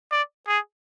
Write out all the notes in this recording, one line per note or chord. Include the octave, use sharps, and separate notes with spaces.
D5
G#4